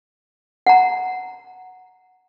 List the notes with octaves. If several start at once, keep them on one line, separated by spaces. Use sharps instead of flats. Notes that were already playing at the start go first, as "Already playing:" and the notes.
F#5 A#5